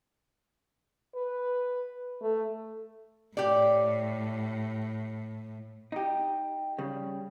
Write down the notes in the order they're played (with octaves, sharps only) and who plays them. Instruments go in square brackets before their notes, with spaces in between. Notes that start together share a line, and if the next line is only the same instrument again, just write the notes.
[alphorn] B4
A3
[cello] A2 [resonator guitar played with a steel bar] G4 D5
[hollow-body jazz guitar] D#4 G4
C#3 G3